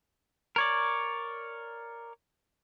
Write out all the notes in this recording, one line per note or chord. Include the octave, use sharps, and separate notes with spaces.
A#4 C#5 D5